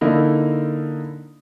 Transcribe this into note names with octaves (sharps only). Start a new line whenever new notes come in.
D3 A#3 D#4 E4